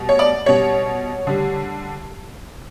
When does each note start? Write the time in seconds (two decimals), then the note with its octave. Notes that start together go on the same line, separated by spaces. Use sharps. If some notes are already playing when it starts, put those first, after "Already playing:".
Already playing: B2 G3
0.09 C#5
0.19 D5
0.46 B2 G3 C#5
1.27 D3 G3